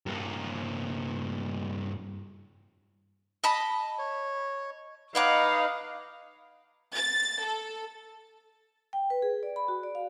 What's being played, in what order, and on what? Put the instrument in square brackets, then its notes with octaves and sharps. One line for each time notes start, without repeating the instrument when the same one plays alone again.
[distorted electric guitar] G2 A#3
[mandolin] D#5 A5 B5
[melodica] C#5
[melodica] D#4 B4 D#5 [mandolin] C#5 F#5 D6 [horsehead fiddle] F5
[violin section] A6
A4
[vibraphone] G5
B4
G#4
D5
B5
F#4
D5
F5